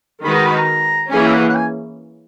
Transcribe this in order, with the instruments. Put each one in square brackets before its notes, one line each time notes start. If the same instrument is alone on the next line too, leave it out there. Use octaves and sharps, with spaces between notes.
[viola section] D#3 G#3 D#4 F#4 B4 [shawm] B5
[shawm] A#5
B5
A#5
[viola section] E3 A#3 C#4 G#4 [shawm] G#5
[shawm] E5
F#5
F#5
G#5